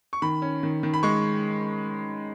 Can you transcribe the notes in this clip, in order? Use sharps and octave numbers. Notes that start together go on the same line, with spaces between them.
C#6
D#3 B5
C#4
D#3
D#3
B5
G#3 C#6